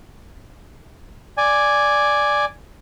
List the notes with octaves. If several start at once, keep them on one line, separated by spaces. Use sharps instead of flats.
D5 G#5